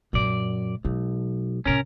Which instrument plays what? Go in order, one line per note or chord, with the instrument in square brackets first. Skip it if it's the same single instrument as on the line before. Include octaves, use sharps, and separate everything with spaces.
[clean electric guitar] F#2 D5 [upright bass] A#2 G#3
[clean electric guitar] B1 [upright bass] G#3
[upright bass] A2 C3 [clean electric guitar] C#4 A#4